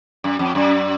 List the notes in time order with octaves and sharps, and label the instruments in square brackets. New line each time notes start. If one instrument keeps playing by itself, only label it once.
[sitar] F#2
F2
F#2